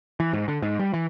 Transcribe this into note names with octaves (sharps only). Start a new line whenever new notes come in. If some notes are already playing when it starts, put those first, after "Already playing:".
E3
G#2
D3
G#2
G3
E3